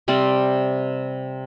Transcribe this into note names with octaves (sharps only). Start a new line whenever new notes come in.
C3 G3 C4 D5